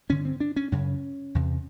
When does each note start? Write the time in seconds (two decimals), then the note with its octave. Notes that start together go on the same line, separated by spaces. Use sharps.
0.09 G2 D3 C#4
0.25 C4
0.40 D4
0.56 C#4
0.72 F#2 C#3 C#4
1.35 E2 C3